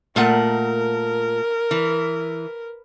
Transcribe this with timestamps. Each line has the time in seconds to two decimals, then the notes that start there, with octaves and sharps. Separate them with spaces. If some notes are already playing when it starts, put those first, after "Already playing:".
0.16 A#2 A3 A#4 F#5
1.71 E3